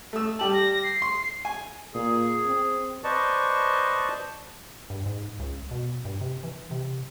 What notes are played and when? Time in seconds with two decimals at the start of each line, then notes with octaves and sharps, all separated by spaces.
0.13 A3 E6
0.39 G3 G4 A5 F#7
0.53 A#6
0.83 C7
1.02 C6
1.45 G#5
1.94 A#2 G#4
2.46 C4
3.04 B4 C5 D5 D#5 A5 C#6
4.90 G2
5.06 G#2
5.40 C#2
5.71 B2
6.05 G2
6.21 C3
6.43 E3
6.71 C3